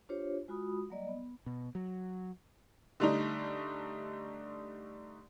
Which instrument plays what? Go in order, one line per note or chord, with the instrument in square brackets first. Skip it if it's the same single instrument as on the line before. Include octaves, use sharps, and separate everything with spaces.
[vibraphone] D4 F4 G4 C5 C#5
G#3 F4 F#4 B5 D#6
F#3 G3 A#3 D5 D#5
B3
[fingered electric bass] B2
F#3
[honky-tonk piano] D3 G3 A3 D4 D#4